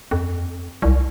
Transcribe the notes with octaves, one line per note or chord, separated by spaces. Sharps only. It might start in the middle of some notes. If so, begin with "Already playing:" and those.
F2
C2